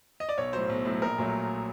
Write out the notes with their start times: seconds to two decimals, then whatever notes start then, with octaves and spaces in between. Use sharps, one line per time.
0.20 D#5
0.29 D5
0.37 B1 C#5
0.53 A2 F#3 C5
0.69 B1
0.85 A2 F#3
1.02 A#1 A#4
1.18 A#2 F#3 A3